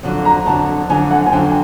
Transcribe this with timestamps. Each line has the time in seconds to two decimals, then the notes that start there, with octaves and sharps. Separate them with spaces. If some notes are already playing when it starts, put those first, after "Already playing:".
0.03 F2 D3 F#3
0.25 A#5
0.46 F2 D3 F#3 A5
0.90 F2 D3 F#3 G#5
1.11 F#5
1.26 G#5
1.32 F2 D3 F#3 G5